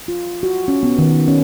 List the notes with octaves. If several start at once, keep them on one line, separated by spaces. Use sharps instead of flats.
F4
F#4
C#4
B3
D#3
C#4